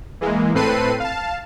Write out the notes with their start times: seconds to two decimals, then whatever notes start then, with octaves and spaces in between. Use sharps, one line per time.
0.21 E3 G#3 A#3
0.55 A2 C4 A4 B4 C7 D#7
1.00 F5 A5